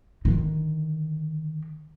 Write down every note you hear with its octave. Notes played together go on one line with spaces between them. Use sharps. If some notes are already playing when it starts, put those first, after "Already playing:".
D3 D#3